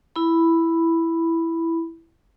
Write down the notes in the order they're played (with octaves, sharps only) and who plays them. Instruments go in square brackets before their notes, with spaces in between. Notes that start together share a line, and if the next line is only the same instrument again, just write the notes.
[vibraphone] E4 B5